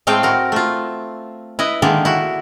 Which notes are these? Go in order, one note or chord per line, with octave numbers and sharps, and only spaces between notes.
A2 G#3 A3 C4 F5 G5
F#4 A#4
A3 F4
E4 B4 D#5
D3 D#3 G#3 A#3 D4
E4 F#4